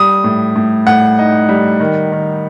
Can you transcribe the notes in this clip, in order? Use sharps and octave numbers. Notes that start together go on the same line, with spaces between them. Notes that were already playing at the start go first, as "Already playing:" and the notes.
Already playing: G3 D#6
A2
A2
A2 F#5
D#4
G3
D#3
D#3